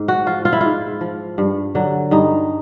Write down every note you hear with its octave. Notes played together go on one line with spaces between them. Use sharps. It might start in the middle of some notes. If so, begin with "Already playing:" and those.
Already playing: G#2
F#4
F3 F4
F4
E4
G#2 F4
F3
G2
D3 F#3
G2 D#4